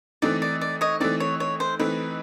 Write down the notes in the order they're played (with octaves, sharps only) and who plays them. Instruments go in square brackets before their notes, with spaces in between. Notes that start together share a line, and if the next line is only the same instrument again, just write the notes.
[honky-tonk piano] E3 A3 C4 D#4 [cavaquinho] D5
[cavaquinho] D5
D5
C#5 D#5
[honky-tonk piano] E3 A3 C4 D#4 [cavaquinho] D5
[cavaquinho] C#5
C#5
C5
[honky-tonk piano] E3 A3 C4 D#4 [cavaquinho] B4